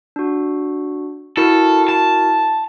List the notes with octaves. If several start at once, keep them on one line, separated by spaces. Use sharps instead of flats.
D4 F#4
E4 F#4 A4 A#4
A5